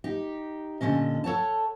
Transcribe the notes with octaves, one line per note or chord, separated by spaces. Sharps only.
D#4 G4
A#2 D3 D#3 C#4 D#5
A4 C#5 F#5 A5